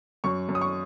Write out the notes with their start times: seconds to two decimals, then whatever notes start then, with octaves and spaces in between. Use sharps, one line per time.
0.24 F#2 C#6
0.49 F#2
0.55 D#6
0.61 C#6